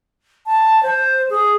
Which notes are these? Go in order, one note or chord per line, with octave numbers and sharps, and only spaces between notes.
A5
C5
G#4